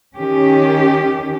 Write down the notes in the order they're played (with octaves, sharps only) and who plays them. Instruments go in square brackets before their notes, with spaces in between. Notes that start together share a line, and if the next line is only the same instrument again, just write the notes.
[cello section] D#3 C#4 G4